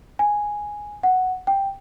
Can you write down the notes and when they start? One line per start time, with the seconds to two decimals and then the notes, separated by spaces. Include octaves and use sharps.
0.19 G#5
1.03 F#5
1.47 G5